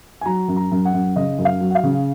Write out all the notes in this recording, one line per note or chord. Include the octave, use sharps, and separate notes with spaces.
G#5
F#3 A#5
F#2
A#5
F#2
F#5
F#2
C#3 D#5
F#2
F5
F#3
F#5
F5
C#3